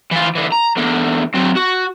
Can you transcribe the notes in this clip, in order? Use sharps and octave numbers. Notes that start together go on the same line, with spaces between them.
E3 F4
D3 E3
A#5
E2 D3
F#3 C4
F#4